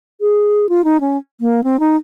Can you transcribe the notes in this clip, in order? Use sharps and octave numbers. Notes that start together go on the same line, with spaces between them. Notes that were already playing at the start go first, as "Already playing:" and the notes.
G#4
F4
D#4
C#4
A#3
C4
D#4